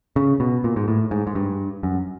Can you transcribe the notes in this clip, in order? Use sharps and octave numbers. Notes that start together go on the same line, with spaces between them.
C#3
B2
A#2
G#2
A2
G#2
G#2
G2
F#2